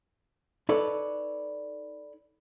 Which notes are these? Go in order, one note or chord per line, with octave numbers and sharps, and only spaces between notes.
D#4 A4 B4 C#5 D5